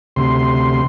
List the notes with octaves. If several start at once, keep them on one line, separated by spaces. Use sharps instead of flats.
D2 C3 C6